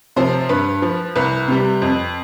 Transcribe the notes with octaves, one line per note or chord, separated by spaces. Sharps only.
C3 F3 C5
G2 B4
F3
C2 B4
C3 G3
F2